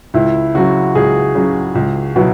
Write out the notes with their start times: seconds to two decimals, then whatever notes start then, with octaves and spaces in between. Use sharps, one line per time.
0.14 C#2 E4
0.54 C#3 F#3 F#4
0.95 C#2 G#4
1.35 C#3 F#3
1.75 C#2
2.16 B2 F#3 E4